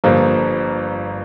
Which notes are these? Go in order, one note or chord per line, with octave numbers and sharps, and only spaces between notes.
G1 G2 F3 A#3